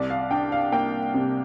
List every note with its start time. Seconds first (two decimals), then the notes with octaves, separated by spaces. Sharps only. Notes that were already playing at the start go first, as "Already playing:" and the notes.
Already playing: C2 D5
0.10 F5
0.31 D4 G5
0.52 F5
0.72 A#3 G5
1.14 C3